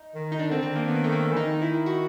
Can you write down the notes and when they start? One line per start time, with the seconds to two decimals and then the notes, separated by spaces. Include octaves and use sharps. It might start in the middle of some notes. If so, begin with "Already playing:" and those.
Already playing: D#4
0.15 D#3
0.32 D#4
0.39 D#3 D4
0.50 D3 C4
0.61 D#3 C4
0.75 A#3
0.88 B3
0.95 A#3
1.04 A3
1.12 A#3
1.32 E3
1.36 D#3 D#4
1.62 E4
1.86 F#4